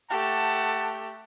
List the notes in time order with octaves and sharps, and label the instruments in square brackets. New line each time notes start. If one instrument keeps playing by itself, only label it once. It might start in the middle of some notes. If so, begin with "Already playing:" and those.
[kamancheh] A3 G4 [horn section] F#5 A5